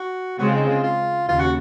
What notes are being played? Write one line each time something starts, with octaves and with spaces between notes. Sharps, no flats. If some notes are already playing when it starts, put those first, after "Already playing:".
Already playing: F#4
C#3 G#3 C4 F#4
F4
D#4
F4
F4
D#2 C#3 F4
F#4